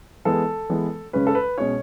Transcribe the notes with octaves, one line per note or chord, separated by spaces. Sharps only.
E3 G#3 B3 A4
E3 G#3 B3
C#3 G#3 C#4 B4
A4
B4
B2 G#3 C#4 C#5